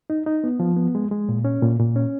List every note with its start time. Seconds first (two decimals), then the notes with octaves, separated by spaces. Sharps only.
0.10 D#4
0.26 D#4
0.44 B3
0.60 F3
0.77 B3
0.95 G#3
1.11 G#3
1.29 A#2
1.45 C#4
1.62 A#2
1.79 A#2
1.96 C#4